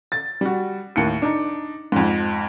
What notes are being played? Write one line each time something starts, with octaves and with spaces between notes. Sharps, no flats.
A6
G3 F#4
D#2 A2 C#7
D4 D#4
F2 G#2